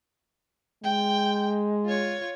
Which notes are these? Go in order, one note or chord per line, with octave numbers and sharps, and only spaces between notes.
G#3 G5
F4 C#5